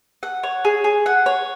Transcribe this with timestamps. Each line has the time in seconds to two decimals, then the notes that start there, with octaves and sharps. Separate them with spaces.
0.23 F#5
0.43 C#5
0.65 G#4
0.84 G#4
1.06 F#5
1.26 C#5